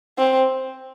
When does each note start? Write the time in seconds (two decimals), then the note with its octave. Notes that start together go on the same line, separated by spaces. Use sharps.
0.18 C4